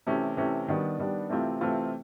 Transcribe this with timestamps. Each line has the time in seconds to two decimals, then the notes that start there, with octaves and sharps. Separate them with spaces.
0.07 C3 E3 A3 C#4
0.37 C3 E3 A3 C#4
0.68 D#3 G3 B3 D4
0.99 D#3 G3 B3 D4
1.30 C3 E3 A3 C4 F4
1.61 C3 E3 A3 C4 F4